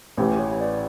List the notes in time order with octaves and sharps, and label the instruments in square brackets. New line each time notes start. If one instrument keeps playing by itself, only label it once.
[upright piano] A1 A2 E3 [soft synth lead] G4
[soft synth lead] C#5
D5